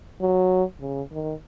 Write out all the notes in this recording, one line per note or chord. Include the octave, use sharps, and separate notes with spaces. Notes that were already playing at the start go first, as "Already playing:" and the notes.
F#3
C#3
D#3